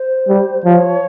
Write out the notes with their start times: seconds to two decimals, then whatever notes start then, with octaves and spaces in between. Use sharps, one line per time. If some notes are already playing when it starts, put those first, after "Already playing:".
Already playing: C5
0.28 G3
0.65 F3 C#5